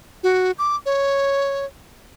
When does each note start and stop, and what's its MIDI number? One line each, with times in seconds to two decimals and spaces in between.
0.23 0.51 66
0.58 0.76 86
0.86 1.65 73